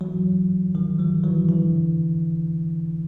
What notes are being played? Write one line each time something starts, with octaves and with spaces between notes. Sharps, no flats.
E3 F#3
D#3 F3
F3 G3
E3 F#3
D3 E3